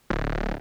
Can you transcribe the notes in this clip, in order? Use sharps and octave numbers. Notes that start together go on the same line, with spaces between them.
D1